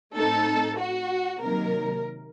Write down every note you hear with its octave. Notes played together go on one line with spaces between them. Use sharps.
A2 A3 C4 D#4 A4
F#4
C3 D#3 F#3 A#3 D#4 A#4